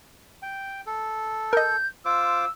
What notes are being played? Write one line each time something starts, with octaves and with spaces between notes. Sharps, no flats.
G5
A4
A#4 D#5 G6
F4 C5 D6 E6